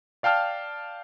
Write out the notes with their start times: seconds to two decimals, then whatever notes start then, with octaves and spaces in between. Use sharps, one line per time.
0.23 D5 F5 G5 A5 F6